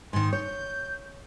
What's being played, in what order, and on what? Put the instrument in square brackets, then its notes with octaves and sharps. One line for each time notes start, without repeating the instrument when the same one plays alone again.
[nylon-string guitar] G#2 D#3 [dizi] C6
[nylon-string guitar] C#5 [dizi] G6